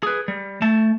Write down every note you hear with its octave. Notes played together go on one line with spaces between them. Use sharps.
G#4 B4
G3
A3 A5